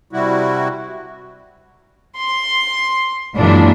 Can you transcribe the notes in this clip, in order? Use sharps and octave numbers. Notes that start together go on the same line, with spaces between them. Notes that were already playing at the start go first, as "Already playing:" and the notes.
C3 G3 E4 F#4
C6
F#2 A#2 E3 G#3 D4